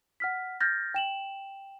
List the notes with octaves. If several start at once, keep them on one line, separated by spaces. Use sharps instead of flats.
F#5 F6 B6
F6 G6 A6 A#6
G5 E7 F#7